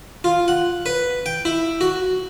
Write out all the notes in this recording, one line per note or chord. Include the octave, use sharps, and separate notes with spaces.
F4
F#5
B4
G5
E4
F#4